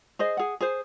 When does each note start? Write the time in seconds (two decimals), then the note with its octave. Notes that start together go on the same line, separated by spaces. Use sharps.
0.19 G#4 C5 D#5
0.37 G#4 F#5
0.61 G#4 C5